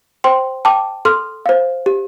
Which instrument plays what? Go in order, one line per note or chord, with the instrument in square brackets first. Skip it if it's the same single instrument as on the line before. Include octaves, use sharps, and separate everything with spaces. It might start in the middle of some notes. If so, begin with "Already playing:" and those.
[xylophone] C5 G5 C6
G5 A5 D6
A4 C6 F6
C5 F5
G4